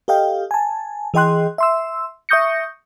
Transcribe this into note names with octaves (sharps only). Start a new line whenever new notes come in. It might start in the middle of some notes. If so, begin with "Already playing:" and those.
G4 A4 D#5 F5 G5
G#5 A5
E3 G#4 D#5 G5 C6 F#6
E5 C6 E6
E5 C#6 D#6 G6 A#6 C#7